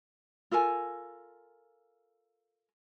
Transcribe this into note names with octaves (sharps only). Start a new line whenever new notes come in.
F4 A4 A#4 G#5